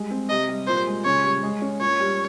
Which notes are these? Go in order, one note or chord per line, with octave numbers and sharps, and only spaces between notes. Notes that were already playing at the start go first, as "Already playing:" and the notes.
Already playing: G3 G#3
C4
C3 D#5
G3
A#2 C5
G#3
C#3 C#5
G3
G#3
C#4
A#2 C#5
G3